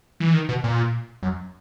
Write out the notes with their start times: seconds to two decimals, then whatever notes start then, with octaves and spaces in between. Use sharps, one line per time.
0.20 E3
0.33 D#3
0.49 B2
0.64 A#2
1.23 F#2